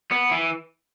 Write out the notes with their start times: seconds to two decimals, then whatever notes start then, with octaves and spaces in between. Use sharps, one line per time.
0.11 B3
0.31 E3